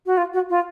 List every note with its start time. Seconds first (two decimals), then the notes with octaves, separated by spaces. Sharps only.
0.06 F#4
0.17 F4
0.33 F#4
0.50 F4